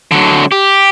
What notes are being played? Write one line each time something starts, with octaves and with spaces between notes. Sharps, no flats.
D3 F#3
G4